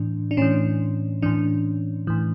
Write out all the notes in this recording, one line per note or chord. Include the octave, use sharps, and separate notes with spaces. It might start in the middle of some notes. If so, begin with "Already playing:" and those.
Already playing: A2 E3 D4
D4
A2 E3 C#4
A2 E3 D4
A2 E3